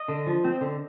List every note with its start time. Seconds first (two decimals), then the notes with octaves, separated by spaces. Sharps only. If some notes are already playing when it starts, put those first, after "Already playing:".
Already playing: D#5
0.08 D3
0.27 F3
0.44 C4
0.61 D3